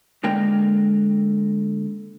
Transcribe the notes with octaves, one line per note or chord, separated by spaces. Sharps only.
D3 G#3 A#3 A#4 G5